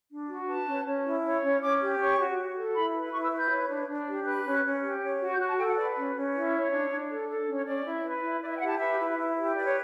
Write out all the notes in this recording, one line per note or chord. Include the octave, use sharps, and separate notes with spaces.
D4
F#4
B4 A5
C#4
C#4
E4
C#5
C#4
C#4 D6
G4
C#5 C#6
F#4
F#4
A4
E4 B5
B4
E4 C#6
E6
B4
G6
C#5
D4
D4
G4
B4 F#6
C#4
C#4
G4
C#5
F#4
G6
F#4 F#6
A5
A4 G5
F#5
B4 D5
C#4
C#4
E4
C#5
D4
D4
A4
A4
C#4
C#5
C#4 D5
E4
B4
E4
E4 D5
E5
G5
G4 F#5
A5
B4 E5
E4
E4
G4
B4 D5
C#5